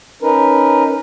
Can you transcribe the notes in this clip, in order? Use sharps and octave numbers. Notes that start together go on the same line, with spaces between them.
C#4 D#4 A#4 B4